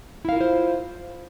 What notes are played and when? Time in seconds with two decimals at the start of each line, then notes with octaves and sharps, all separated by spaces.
0.25 E4
0.29 F5
0.33 A#4
0.37 F4
0.41 C5